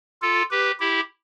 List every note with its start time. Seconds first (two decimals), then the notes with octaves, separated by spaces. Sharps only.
0.22 F4 A4
0.51 G4 B4
0.80 E4 G4